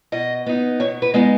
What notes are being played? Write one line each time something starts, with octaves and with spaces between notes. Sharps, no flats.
B2 D#5
B3 D#4
B2 C#5
B4
G#3 B3 D#4